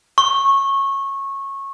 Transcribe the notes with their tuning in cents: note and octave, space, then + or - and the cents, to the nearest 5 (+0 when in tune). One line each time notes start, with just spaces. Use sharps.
C#6 -20